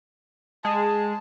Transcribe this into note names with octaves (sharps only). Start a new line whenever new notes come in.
G#3 G#4 A5